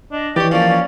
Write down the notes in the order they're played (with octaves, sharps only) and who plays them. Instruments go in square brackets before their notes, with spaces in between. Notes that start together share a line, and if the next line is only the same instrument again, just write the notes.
[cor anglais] D4 [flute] D#5
[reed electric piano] E3 [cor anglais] G4 [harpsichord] C#5 D5
[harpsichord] F3 A#3 [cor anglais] C#4 [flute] D5
[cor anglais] C#4